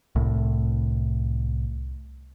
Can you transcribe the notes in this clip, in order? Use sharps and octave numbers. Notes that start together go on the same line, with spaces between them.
C2 A2